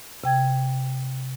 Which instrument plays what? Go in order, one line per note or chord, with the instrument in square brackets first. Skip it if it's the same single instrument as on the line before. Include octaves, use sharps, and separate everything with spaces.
[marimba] C3 G5 G#6